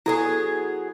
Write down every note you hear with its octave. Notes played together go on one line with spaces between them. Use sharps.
F#3 B3 E4 G#4 A4